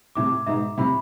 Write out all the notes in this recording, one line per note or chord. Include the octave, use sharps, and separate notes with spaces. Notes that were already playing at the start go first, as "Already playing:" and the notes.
A2 C3 D6
G#2 B2 E5
A2 C3 B5